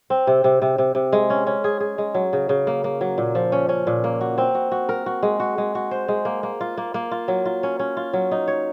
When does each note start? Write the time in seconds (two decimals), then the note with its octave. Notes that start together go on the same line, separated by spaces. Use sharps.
0.10 C4
0.27 C3
0.44 C3
0.62 C3
0.78 C3
0.95 C3
1.13 G#3
1.30 C#4
1.47 C#4
1.64 G#4
1.80 G#4
1.98 G#3
2.14 F#3
2.33 C#3
2.49 C#3
2.67 A#3
2.84 A#3
3.01 F#3
3.18 A#2
3.35 F3
3.52 C#4
3.69 C#4
3.87 A#2
4.04 A#3
4.21 F#4
4.38 C4
4.55 F#4
4.72 F#4
4.89 A#4
5.06 F#4
5.23 G#3
5.40 F#4
5.58 G#3
5.75 F#4
5.91 C5
6.08 G#3
6.25 A#3
6.43 A#3
6.61 F4
6.77 A#3
6.94 A#3
7.11 F4
7.28 F#3
7.46 F4
7.63 C#4
7.79 C#4
7.97 F4
8.13 F#3
8.31 D#4
8.48 C#5